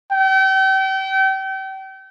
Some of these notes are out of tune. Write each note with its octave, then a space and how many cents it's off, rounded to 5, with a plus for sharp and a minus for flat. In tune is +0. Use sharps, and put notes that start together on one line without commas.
G5 -35